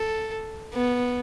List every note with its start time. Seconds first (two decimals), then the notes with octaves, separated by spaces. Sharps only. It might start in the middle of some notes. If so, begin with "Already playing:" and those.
Already playing: A4
0.73 B3